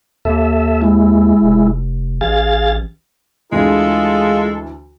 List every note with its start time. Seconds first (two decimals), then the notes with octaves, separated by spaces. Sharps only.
0.25 D#2 A4 E5
0.82 G#3 E4
1.43 F1
2.21 A1 G#4 F5 A6
3.52 D2 E3 G#3 F4 G#4 A4